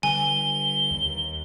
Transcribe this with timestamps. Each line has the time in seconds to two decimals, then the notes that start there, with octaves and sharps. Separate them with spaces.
0.03 D3 G3 G#5 G7
0.91 D#2